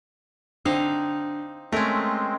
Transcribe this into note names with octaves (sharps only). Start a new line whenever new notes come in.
D3 C4 D#4 F5
G#3 A3 C4 C#4 A#4